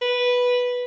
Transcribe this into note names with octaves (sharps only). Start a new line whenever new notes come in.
B4